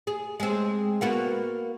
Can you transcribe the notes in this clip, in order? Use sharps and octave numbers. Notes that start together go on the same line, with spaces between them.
G#4
G#3 C4
A#3 B3 F#4